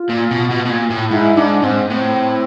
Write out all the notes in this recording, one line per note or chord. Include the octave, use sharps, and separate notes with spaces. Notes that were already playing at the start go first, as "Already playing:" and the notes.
Already playing: F4
A#2
B2
B2
B2
A#2
A2
G#2 E4
G#2 D4
G#2 C4
A2 C4